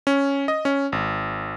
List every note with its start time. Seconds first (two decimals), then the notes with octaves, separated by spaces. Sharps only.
0.07 C#4
0.48 D#5
0.65 C#4
0.92 G#1